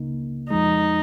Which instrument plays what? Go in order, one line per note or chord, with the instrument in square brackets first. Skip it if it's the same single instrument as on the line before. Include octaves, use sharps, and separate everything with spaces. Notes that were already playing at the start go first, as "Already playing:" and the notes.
Already playing: [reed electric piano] C#2 C#3 A#3 D#4
[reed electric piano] F2 F3 G#3 [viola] D#4